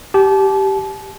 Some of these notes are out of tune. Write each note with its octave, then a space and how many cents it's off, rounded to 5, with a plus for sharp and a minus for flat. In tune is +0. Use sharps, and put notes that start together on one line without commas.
G4 -10 A5 -35